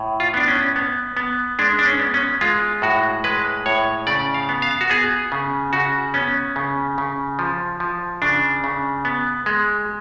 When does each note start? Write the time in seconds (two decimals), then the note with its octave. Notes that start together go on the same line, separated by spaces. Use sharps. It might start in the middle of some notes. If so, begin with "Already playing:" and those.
Already playing: A2
0.20 F4
0.34 B3 D4
0.48 C#4
0.76 B3
1.17 B3
1.59 G#3 D4
1.79 D4
1.85 C#4
2.00 B3
2.14 C#4
2.41 G#3 F4
2.82 A2 F#4
3.24 G#3 B4
3.66 A2 C#5
4.07 C#3 D5
4.34 F5
4.49 B3
4.62 F5
4.81 F#4
4.90 B3 G#4
5.32 C#3
5.73 C#3 F#4
6.14 B3 C#4
6.56 C#3
6.98 C#3
7.39 F3
7.80 F3
8.22 C#3 D4
8.64 C#3
9.05 B3
9.46 G#3